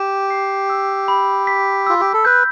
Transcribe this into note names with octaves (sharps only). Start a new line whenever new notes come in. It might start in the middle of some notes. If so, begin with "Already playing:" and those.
Already playing: G4 E7
C7
E6
B5
B6
F4 E6
G4
A4
B4 G6